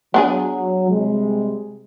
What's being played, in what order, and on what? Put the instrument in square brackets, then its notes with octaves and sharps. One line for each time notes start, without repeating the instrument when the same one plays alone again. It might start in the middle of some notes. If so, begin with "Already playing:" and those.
[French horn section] F#3 [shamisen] B3 D4 G#4
[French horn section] C3 G3 G#3